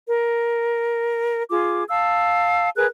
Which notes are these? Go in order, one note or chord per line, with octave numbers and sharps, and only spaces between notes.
A#4
F4 G#4 D6
F5 A5 E6
G#4 A#4 B4 F#6